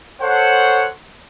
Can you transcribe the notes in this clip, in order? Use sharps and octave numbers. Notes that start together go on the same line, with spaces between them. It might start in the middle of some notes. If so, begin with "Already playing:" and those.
A4 C5 C#5 F#5